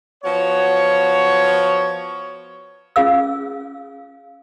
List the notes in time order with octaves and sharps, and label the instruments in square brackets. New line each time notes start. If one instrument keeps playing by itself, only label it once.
[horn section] F3 B3 F#4 C#5
[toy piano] C#4 F4 G#4 F5 E6